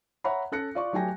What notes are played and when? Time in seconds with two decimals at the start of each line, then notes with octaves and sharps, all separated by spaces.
0.24 C#5 E5 F#5 A#5 B5
0.52 C#4 A4 F#6 A#6 C#7
0.75 F4 D5 C#6
0.93 F#3 A3 G4 G5 G#5 A#6